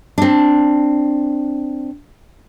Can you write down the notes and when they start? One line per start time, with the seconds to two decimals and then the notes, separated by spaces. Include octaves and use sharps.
0.18 C4 D4